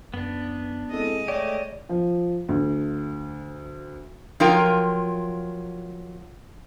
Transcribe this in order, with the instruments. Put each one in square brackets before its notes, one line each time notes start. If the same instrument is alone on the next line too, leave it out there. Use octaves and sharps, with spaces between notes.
[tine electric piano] F#2 [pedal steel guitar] B3 D4
[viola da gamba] G#3 D#5 [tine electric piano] C4 E4 A4
[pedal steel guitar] A3 G4 [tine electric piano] C#5 [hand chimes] D5
[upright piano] F3
D2
[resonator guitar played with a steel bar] F3 F#3 F4 A#4 G5